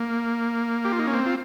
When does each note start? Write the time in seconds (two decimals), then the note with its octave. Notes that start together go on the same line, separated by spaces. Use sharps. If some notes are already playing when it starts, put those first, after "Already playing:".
Already playing: A#3
0.85 G4
0.92 F4
0.99 D#4
1.07 C#4
1.14 C4
1.26 F4